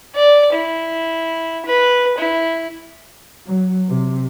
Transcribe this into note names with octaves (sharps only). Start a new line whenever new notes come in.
D5
E4
B4
E4
F#3
C3